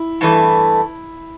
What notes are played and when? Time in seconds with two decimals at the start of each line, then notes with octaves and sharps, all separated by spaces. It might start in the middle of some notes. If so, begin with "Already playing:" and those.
Already playing: E4
0.21 G2 E3 A3